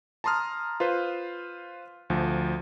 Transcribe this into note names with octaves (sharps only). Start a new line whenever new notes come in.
A5 A#5 C6 D#6 F6
F4 B4 C5
D2 F3